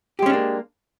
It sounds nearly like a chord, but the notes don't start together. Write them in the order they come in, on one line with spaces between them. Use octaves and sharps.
G4 G#3 C#4 D4 A#3